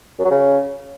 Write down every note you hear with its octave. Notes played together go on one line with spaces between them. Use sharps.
F#2
F#3
C#3